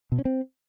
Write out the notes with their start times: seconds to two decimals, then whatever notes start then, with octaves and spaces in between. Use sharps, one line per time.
0.12 B2
0.19 C#4
0.25 C4